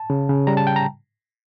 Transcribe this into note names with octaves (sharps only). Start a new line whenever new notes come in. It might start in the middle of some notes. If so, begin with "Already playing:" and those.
Already playing: A5
C#3
C#3
G3 A#5
A5
G5
A#5